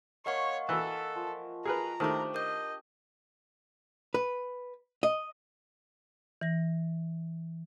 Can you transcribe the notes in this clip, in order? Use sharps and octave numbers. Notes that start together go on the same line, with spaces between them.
A#3 C#5 D#5 F5 F#5 C6 C#6
E3 A4 A#4
F3
G#4 A#4 B4 A#5
D#3 A3 D4 G4 C5 D6
A#4 D#5 G6
B4
D#5
E3 A#6